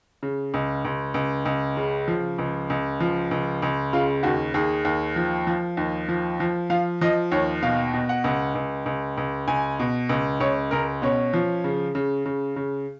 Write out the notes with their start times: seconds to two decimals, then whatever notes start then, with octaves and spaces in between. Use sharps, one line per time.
0.23 C#3
0.54 C#2
0.85 C#2
1.14 C#2
1.45 C#2
1.77 C#3
2.08 F3
2.38 C#2
2.70 C#2
3.00 F3
3.31 C#2
3.62 C#2
3.93 C#3 F4
4.23 D#2 F#4
4.54 D#2 G#4
4.85 D#2
5.16 F3
5.47 F3
5.77 D#2
6.09 F3
6.40 F3
6.70 F3 F5
7.01 F3 D#5
7.32 D#2 C#5
7.62 B2 F5
7.94 B2
8.09 F#5
8.24 C#2
8.55 C#2
8.86 C#2
9.17 C#2
9.48 C#2 G#5
9.80 B2
10.09 C#2
10.40 C#2 C#5
10.71 C#2 A#4
11.02 B2 C#4
11.34 F3
11.64 C#3
11.95 C#3
12.26 C#3
12.56 C#3